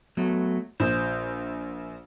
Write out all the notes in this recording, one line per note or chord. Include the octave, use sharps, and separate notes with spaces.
F#3 A3 B3
A#1 C5